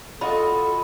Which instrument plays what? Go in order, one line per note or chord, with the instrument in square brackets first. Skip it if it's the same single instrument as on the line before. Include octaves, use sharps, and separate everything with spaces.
[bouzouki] F4 F#4 D#5 [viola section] A4 [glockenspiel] B5